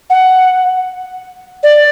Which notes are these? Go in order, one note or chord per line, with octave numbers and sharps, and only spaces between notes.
F#5
D5